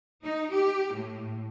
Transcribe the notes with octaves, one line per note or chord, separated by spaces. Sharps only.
D#4
G4
A2